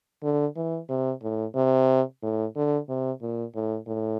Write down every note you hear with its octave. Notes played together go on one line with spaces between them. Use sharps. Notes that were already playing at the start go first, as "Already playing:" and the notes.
D3
E3
C3
A2
C3
A2
D3
C3
A#2
A2
A2